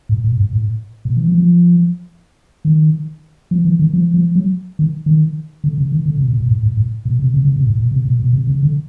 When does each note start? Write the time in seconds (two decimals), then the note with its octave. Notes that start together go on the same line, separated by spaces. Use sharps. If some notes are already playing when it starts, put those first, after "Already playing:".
0.09 A2
0.24 A#2
0.37 G#2
0.53 A2
1.05 B2
1.17 E3
1.27 F3
1.38 F3
2.65 D#3
3.51 F3
3.65 E3
3.79 D#3
3.93 F3
4.14 F3
4.35 F#3
4.79 D#3
5.06 D#3
5.64 D3
5.78 C#3
5.92 D#3
6.06 D3
6.17 C3
6.28 B2
6.38 A#2
6.48 A2
6.63 A2
6.77 A2
7.05 B2
7.19 C3
7.34 C#3
7.45 C#3
7.56 C3
7.67 A2
7.77 A#2
7.91 C3
8.05 B2
8.19 B2
8.33 C3
8.47 C#3
8.63 D3